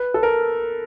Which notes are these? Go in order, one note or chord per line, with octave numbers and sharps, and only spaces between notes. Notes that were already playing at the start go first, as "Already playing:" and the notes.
Already playing: B4
A4
A#4